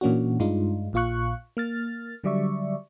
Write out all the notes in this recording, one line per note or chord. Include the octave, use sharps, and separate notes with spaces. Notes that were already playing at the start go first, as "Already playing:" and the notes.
A#2 E3 A#3 C#4 D4 F#4
G2 G#3 D4 D#4 F4
A#1 A#2 F4 F5 C#6 F#6
A#3 F6 A6
D3 F#3 G3 D5 E5 C#6